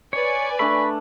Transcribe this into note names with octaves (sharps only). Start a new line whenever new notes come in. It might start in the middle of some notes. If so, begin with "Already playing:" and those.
B4 C#5 D5 G#5
A3 D4 B5